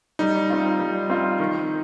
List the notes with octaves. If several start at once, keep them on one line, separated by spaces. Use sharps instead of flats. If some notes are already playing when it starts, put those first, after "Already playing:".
G3 D#4
C4 F4
G3
C4 F4
D#3